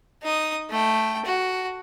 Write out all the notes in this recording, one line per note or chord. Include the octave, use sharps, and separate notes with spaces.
D#4 D#6
A3 G5
F#4